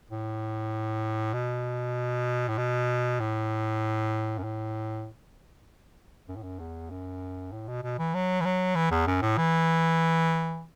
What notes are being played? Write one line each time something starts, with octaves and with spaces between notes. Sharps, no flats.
A2
B2
A2
B2
A2
F#2
A2
F#2
A2
F#2
E2
F#2
A2
B2
B2
E3
F#3
E3
F#3
E3
E2
F#2
A2
E3